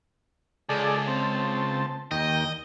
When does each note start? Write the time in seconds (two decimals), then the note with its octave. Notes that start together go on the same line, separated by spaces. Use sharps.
0.69 C#2 G#4 A4 D5
1.08 C4 A5
2.11 D#2 D#5 G5